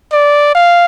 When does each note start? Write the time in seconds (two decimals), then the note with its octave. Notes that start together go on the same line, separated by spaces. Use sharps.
0.13 D5
0.55 F5